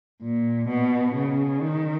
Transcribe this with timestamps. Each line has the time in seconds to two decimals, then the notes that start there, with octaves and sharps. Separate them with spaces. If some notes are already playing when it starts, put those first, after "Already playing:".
0.22 A#2
0.68 B2
1.15 C#3
1.61 D#3